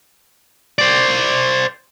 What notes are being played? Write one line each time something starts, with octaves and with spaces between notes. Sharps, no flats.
C5 D5